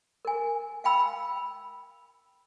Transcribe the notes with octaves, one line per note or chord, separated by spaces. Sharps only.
A#4 G#5
F5 G5 B5 E6